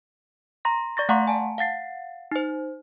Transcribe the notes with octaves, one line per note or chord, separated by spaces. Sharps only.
A#5 C6 A#6
D5 C#6 A6 A#6
A3 F5 F#5 A#5 C6 C#6
G#5 A5
F5 F#5 A6 C7
D#4 C5